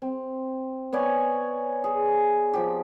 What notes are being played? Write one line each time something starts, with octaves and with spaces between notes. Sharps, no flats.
C4
B3 C#5 D5 G#5
G#4
F3 G4